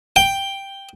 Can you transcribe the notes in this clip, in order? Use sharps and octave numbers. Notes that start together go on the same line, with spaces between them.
G5